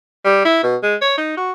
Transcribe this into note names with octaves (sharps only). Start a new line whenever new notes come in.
G3
E4
B2
G#3
C#5
D#4
F#4